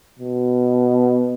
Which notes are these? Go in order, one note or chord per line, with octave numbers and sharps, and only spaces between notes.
B2